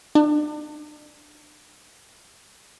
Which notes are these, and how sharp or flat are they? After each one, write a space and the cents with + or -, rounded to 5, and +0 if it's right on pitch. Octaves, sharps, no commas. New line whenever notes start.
D4 +40